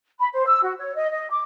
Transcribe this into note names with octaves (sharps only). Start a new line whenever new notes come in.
B5
C5
E6
F#4
C#5
D#5
D#5
D6